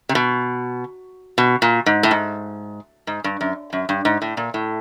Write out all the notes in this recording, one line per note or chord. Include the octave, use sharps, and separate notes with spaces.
C3
B2
B2
A#2
G#2
A2
G#2
G#2
G2
F#2
F#2
G2
G#2
A2
A#2
A2